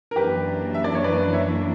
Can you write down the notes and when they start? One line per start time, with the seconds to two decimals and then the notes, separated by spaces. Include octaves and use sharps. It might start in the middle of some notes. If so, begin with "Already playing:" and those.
0.11 A#4
0.16 F#2 E3 A#3 D4 G4 B4
0.74 E5
0.84 D5
0.95 C#5
1.04 B4 D5
1.33 C#5 E5